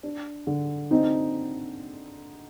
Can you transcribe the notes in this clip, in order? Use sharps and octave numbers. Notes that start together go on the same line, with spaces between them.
D4
D3
C4 D#4